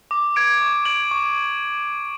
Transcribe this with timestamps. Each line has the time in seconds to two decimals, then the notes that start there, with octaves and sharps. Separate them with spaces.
0.11 D6
0.36 G#6 D7
0.61 C#6
0.85 G#6 D7 F#7
1.11 C#6